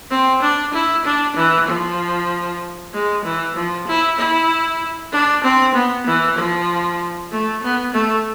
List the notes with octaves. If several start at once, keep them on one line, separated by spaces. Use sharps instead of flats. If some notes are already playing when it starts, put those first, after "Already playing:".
C4
D4
E4
D4
E3
F3
G#3
E3
F3
E4
E4
D4
C4
B3
E3
F3
A3
B3
A3